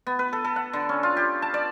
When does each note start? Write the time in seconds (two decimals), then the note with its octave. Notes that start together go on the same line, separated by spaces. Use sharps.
0.07 B3
0.19 B4
0.33 A4
0.44 A4
0.56 F#5
0.73 D3
0.89 C#4
1.03 F4
1.17 G4
1.42 A5
1.54 D5